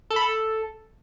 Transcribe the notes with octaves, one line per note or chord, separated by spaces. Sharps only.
A4
B5
A4